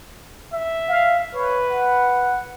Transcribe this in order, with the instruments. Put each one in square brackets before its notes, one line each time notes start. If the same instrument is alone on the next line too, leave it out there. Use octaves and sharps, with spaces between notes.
[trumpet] E5
[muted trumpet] F5
[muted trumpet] B4 [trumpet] C#5
[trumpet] F#5